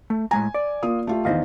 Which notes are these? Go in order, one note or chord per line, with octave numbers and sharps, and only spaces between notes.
A3
A2 G#3 G#5 A#5
D5
A#3 F4 D#6
A3 F4 G4
E2 D#3 C5 D#5 F5